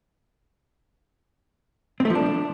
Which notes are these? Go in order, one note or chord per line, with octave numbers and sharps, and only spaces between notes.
C4
A3
F3
D4